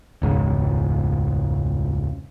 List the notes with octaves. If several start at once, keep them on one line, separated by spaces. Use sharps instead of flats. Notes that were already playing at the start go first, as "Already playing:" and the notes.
E1 C#2 G#2